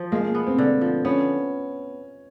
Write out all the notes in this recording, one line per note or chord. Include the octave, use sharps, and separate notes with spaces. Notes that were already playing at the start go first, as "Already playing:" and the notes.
Already playing: F3
G#3 A#3
A#3
B3
C4
D3
F3
B3 C#4